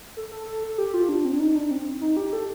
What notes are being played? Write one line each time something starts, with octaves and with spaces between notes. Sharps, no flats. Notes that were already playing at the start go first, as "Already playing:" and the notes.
A4
A4
A4
A4
G4
F4
D4
C4
D4
D#4
D4
C4
D#4
G4
A4